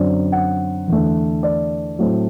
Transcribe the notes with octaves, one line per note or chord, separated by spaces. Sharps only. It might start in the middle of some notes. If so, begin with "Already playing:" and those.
Already playing: F#2 D3 F#3 C4 D5
F#5
E2 D3 A3
D5
A2 F#3 A3 C4